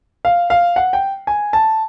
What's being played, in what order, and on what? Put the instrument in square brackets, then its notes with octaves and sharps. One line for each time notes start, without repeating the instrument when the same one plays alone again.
[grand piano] F5
F5
F#5
G5
G#5
A5